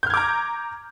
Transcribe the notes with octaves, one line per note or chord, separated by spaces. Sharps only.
A#5 D6 F6 G6 G#6